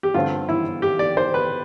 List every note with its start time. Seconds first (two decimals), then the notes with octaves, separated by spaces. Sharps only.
0.03 G4
0.14 G2 D3 A3 C4 F4
0.49 E4
0.82 G4
0.99 D5
1.17 C5
1.34 B4